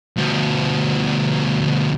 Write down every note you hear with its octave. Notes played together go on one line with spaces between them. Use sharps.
D2 B2